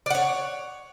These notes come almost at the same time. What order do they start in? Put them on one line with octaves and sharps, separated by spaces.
D5 F#5 C#5